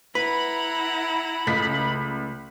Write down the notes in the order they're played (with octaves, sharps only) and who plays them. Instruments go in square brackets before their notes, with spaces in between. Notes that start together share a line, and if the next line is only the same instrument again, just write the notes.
[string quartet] E4 F#5 A#5 [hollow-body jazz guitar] B4 [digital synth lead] B5
[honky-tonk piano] C#2 B6 [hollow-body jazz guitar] C#3 A3